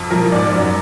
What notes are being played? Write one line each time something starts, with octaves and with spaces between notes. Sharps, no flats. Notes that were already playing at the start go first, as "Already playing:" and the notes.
Already playing: F2
F3 A#4
G#2 D5
F#2